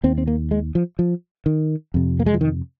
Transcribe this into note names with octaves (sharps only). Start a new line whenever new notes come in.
D#2 C4
C4
A#3
G#3
F3
F3
D#3
F2 C3
A#3
G#3
F3
D#3